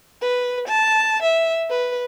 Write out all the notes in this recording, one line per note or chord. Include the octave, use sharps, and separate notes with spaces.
B4
A5
E5
B4